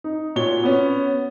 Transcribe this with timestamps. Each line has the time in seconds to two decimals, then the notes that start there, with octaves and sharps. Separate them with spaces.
0.04 D#4
0.36 A#2 F#4 C#5 G7
0.63 B3 C#4